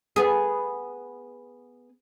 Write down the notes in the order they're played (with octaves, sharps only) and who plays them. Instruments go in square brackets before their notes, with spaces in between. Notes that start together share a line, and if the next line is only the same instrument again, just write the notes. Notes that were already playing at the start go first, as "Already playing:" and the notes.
[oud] B3 G#4